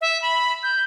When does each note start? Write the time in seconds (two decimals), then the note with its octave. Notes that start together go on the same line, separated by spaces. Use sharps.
0.01 E5
0.22 B5
0.63 G6